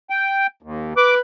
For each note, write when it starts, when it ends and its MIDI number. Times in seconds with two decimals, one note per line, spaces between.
0.10 0.47 79
0.62 0.93 39
0.97 1.20 71
0.97 1.15 86